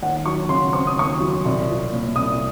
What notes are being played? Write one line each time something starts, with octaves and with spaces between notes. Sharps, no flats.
D#2 F#5
F#3 C#6
C#3 C6
C4 C#6
D#6
D#2 C#6
F#3
C2
F3
A#2
C2 D#6